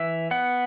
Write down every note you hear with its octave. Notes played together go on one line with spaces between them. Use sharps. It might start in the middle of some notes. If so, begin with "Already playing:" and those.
Already playing: E3 E5
B3 F#5